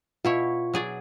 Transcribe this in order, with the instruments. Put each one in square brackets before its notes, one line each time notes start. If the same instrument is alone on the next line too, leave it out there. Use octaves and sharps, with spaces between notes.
[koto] B2 E4 C#5 [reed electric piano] F4 C#6
[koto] F#3 G#4 D5